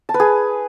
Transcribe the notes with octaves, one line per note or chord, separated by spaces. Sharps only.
A5
B4
G#4